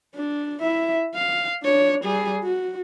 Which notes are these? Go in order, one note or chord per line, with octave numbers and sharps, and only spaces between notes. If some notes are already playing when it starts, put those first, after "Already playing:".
D4
E4 E5
F5
D4 C#5
G3 G#4
F#4